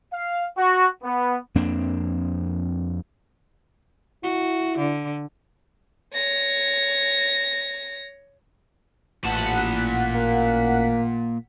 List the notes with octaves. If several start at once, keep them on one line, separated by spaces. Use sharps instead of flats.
F5
F#4
B3
F2 A#3 C4 D4
E4 F#4
D3
C#5 A#6
A1 A#2 F#5 A5 B6
A#3